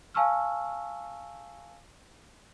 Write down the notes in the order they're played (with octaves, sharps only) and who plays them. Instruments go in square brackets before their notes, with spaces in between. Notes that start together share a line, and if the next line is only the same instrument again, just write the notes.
[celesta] F5 G#5 A5 C#6 E6 F6